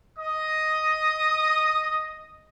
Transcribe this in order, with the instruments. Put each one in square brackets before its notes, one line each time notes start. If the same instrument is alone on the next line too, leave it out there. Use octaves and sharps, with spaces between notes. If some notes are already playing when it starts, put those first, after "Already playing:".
[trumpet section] D#5 D#6